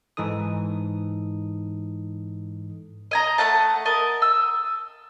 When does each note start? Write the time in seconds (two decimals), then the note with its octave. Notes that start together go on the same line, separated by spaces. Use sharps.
0.17 G#2 E3 D#4 A4 D#6
3.11 D#5 G#5 A#5
3.38 A3 F#5 A5
3.86 A#4 D#5 A5
4.22 E6